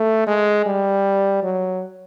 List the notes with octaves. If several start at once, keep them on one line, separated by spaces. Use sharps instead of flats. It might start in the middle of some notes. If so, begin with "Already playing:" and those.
Already playing: A3
G#3
G3
F#3